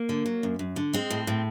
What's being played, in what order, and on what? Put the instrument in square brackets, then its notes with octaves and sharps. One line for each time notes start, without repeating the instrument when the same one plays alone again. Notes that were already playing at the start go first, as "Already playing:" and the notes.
Already playing: [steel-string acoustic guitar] A#3
D3
F#3
F#2
F#2
D3
G#3 C4
A2
A2